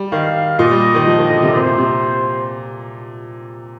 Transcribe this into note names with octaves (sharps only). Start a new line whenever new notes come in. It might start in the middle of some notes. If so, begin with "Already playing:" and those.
Already playing: G3
D#3 F5
A#2 D#5
G3
D#3
F3
D#3
D3
C3
A#2 C5
C3
C3